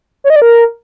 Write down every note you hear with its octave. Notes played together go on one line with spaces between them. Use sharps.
C#5
D#5
D5
A#4